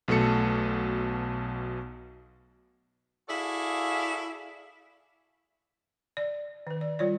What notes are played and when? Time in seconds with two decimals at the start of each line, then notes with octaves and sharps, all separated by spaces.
0.08 B1 B2 A3 A4 C#7
3.29 E4 F#4 G#4 A4 D5 F5
6.17 D5
6.67 D#3 B4
6.81 D5
6.99 G3 F4 C#5 D5